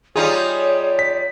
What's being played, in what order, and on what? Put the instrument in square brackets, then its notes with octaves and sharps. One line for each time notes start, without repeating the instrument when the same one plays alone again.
[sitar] G3 D#4 F4 [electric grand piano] G#4 [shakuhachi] C#5
[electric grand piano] B6